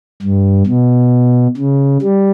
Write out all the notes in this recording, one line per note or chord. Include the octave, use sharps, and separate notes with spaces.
G2
B2
C#3
G3